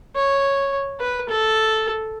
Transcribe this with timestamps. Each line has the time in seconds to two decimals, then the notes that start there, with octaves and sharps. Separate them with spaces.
0.16 C#5
1.00 B4
1.29 A4